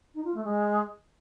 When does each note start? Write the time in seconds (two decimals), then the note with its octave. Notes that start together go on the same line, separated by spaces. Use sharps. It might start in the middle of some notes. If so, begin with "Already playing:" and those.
0.14 D#4
0.24 F4
0.34 A3
0.44 G#3